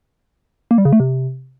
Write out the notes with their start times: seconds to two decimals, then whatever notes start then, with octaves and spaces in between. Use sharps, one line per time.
0.71 A#3
0.78 G3
0.85 C#3
0.93 A3
1.00 C3